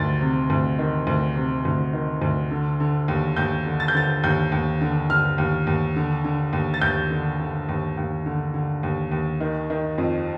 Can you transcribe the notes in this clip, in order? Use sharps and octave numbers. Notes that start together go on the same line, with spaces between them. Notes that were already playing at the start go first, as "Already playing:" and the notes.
Already playing: D2 D#3 A6
C3
D2
D#3
D2
C3
D2
D#3
D2
D3
D3
D#2
D#2 G6
D3
A6
G6
D3 A6
D#2 G6
D#2
D3
D3 F6
D#2
D#2
D3
D3
D#2
A6
D#2 G6
D3
D3
D#2
D#2
D3
D3
D#2
D#2
D#3
D#3
F2